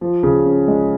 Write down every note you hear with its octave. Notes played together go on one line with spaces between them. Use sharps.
F3
C#3
C#4
G#3